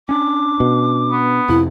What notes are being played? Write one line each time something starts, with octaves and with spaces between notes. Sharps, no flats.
C#4 D4 D6
B2
B3
F2 C3 E4